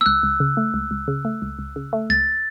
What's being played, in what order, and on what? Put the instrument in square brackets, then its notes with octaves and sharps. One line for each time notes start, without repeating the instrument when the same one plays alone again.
[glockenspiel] E6
[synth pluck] C#2 [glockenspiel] F#6
[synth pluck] C#2
C#3
A3
C#2
C#2
C#3
A3
C#2
C#2
C#3
A3
[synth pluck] C#2 [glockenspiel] A6